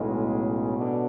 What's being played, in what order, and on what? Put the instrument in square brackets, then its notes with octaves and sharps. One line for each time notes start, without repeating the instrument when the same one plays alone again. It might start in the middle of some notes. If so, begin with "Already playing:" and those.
Already playing: [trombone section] B1 A2 G#3 [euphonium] C#3
[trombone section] B2 [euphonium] D3